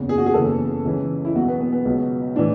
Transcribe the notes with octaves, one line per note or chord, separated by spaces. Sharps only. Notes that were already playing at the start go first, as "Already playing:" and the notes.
Already playing: F#1 E2 C#3
G#4
F#4
G#4
F#1 E2 C#3 E3 A4
C#2 C#3 E3
E4
E2 B2 F#3 F#4
B3
B3
B3
C#2 B2 F#3
A2 E3 D4